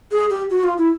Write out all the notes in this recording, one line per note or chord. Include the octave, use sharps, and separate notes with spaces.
G#4
G4
F#4
F4
E4